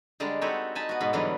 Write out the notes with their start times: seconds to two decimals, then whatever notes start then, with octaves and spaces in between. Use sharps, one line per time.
0.20 D3 G3 G#3 D4 D5 A#5
0.41 C4 D#4 F#4 A4 B4 C#5
0.75 D#4 D#5 G#5 A5 B5
0.89 B3 F#4
1.00 G#2 B2 B5
1.13 B2 D3 E3 F#3 G3 B3